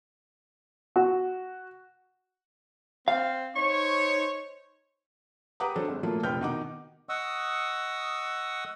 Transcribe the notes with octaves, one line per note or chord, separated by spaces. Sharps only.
F#4
C4 F5
D#4 C5 C#5 C#6
G4 B4 F#5 A#5 D6 D#6
F#3 D4 A4 C5
G#1
A#2 F3 F#3 A3 A#3 F4
F1 A#1 B4 G5 F6 G6
B2 D#3 D#4 F#5 D6
D#5 F#5 C#6 D#6 E6